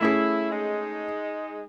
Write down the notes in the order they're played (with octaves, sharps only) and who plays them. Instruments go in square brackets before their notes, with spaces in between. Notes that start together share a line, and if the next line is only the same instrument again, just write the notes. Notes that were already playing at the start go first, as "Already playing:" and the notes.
[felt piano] A3 C#4 G#4 [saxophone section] E4
[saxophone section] G#3 D#4